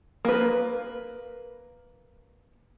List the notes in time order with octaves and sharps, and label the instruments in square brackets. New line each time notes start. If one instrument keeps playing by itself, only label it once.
[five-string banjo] A#3 B4